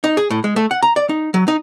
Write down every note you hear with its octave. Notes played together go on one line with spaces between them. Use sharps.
D#4
G#4
A2
G#3
A3
F#5
A#5
D5
D#4
F#3
D#4